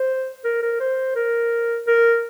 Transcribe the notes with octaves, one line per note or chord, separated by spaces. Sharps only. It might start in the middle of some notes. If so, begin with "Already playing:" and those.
Already playing: C5
A#4
A#4
C5
A#4
A#4